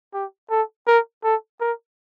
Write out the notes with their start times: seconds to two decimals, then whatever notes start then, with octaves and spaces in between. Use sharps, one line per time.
0.14 G4
0.51 A4
0.87 A#4
1.24 A4
1.61 A#4